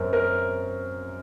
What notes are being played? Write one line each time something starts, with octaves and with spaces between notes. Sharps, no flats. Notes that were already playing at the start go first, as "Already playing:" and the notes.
Already playing: F#2 C4 A#4
A#4